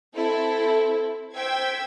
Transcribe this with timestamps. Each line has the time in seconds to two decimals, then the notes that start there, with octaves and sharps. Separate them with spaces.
0.15 C4 E4 A4
1.34 C5 G5 E6 G#6 B6